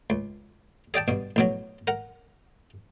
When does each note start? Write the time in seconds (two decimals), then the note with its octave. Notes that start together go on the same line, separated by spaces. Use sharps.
0.10 C#2
0.94 G#4 D5 G5 A5
1.08 G2 B2
1.36 A1 B2 F#3
1.87 A#4 F#5